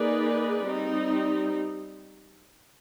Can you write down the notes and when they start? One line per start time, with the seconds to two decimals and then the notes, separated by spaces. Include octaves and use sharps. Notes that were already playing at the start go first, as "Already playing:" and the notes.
Already playing: A#3 D#4 G#4 B4 D5
0.67 G3 C4 D#4